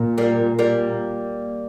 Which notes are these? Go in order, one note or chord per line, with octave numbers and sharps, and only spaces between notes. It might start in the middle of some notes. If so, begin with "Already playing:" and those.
Already playing: A#2
G3 A#3
G3 A#3